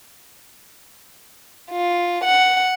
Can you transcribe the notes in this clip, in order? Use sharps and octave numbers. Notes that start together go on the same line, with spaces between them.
F4
F#5